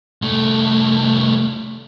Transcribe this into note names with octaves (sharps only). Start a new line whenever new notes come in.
C2 A3